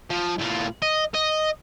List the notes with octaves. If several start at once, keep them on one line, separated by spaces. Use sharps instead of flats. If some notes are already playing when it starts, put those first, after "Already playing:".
F3
A2 F4
D#5
D#5